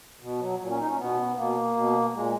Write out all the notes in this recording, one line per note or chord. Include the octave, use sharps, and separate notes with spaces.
B2
F#3
A#2 F#3
C#4
D#4
C#4
B2 B3
B2 A#3
B2
A#2 G#3